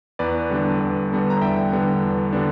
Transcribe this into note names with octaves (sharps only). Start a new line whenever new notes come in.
E2 B4 D5
D3 G3 B3 D4
E2
D3 G3 B3 D4
A#5
E2 E5 G5
D3 G3 B3 D4
E2
D3 G3 B3 D4